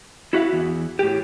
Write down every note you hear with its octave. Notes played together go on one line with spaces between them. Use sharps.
E4 F#4 E5 F5
E2
A2 G4